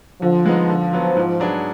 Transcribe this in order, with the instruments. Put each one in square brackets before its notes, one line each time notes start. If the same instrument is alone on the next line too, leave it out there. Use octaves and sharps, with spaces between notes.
[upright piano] D3 [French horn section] F3
[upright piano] G#3 B3 D#4
D3
F#3 B3
G#2
F#3 D4 G#4 B4